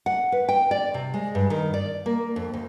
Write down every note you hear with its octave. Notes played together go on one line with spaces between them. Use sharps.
F#5
B4
G5
D5
C3
G#3
G2
D#3
D5
A#3
F2
D2